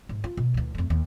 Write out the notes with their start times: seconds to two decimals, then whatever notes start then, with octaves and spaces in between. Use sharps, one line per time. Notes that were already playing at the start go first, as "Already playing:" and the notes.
0.09 G#2
0.24 F4
0.37 B2
0.54 D2 E3
0.75 F2 A3
0.90 D#2